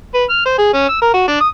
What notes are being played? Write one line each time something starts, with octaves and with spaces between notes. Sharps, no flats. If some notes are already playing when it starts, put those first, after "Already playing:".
B4
F6
C5
G#4
C#4
E6
A#4
F#4
D4
D#6